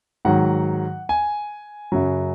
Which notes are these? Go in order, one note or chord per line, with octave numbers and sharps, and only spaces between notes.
G#2 D#3 F#3 F#5
G#5
F#2 C#3 F#3